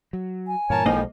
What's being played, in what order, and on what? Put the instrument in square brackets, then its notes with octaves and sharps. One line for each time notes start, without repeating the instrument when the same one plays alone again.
[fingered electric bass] F#3
[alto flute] G#5
[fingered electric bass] G2 A#2 E3 [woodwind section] A#4 C#5 A5
[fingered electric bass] B1 G#3 [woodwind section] F2 A2 F3 [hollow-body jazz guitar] A#3 D#4 D#5